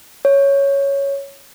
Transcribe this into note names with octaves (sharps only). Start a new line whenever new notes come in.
C#5